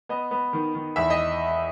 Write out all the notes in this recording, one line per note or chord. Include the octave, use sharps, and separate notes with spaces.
B3 D#5
B3
D#3
D#3
E2 E5
D#5